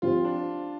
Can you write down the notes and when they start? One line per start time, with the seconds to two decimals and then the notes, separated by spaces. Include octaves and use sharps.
0.02 F3 C4 F4 G4 C5
0.24 D4